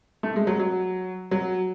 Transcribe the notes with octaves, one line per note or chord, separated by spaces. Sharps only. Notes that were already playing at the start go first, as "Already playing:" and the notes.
A3
G#3
F#3
F#3
F#3